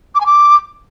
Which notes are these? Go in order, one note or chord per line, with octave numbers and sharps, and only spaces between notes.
D6
G#5
D6